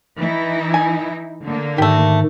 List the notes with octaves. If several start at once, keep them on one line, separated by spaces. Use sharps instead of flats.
E3 D#4 E4
G#5
D3 A#3
G#2 D#3 A3 G4